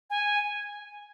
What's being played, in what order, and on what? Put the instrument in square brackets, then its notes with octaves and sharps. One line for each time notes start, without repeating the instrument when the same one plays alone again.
[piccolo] G#5